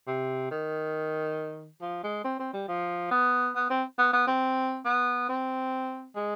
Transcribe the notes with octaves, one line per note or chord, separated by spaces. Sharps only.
C3
D#3
F3
G#3
C4
C4
G3
F3
B3
B3
C4
B3
B3
C4
B3
C4
G#3